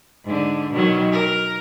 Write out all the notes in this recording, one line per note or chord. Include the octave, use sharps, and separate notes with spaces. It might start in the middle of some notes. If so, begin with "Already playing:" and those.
G#2 D3
B2 D#3 F#3
A#4